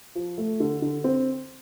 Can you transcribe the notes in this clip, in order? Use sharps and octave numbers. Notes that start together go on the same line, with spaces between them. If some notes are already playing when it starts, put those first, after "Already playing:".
F3
A3
D3
D3
C4